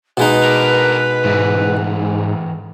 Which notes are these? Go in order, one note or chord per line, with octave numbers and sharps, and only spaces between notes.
B2 G#3 D#4 B4
D4 A#4
G#2 D3 E3